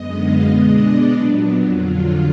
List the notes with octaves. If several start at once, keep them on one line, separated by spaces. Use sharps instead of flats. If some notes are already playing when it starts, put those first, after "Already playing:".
Already playing: F#2 D3 G#3 B3 D#5
F5
B2 G#3 B3 D4 D#5
D5
A#2 F#3 B3 D4
F2 D3 F#3 F4
F4